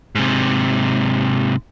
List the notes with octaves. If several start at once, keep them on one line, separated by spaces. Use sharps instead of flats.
G#2 C3